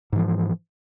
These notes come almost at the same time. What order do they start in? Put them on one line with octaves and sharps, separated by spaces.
G#2 E3 F3